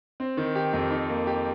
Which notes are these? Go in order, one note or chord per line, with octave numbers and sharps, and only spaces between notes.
C4
D#3
G4
F2
D#4
A#3
G4